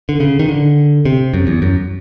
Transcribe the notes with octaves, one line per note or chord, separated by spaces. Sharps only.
D3
C#3
D#3
D3
C3
F#2
E2
F#2